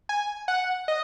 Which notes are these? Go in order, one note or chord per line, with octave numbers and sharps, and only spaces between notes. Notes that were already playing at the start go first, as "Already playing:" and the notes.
G#5
F#5
D#5